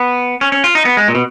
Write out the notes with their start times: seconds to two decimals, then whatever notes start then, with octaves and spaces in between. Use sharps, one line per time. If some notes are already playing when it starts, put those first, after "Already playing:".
Already playing: B3
0.41 C#4
0.52 C#4
0.64 F4
0.75 D#4
0.85 B3
0.97 G#3
1.08 A#2
1.15 B2